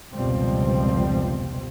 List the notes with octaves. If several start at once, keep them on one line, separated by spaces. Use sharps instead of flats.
F1 C#2 B2 F3 G3 C4